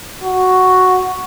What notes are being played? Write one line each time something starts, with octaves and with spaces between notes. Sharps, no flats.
F#4